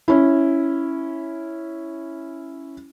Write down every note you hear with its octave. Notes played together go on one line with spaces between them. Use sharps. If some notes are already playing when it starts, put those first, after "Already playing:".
C#4 E4